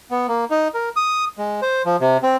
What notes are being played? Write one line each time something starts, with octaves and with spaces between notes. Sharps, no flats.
B3
A#3
D#4
A#4
D#6
G#3
C5
F3
C3
C4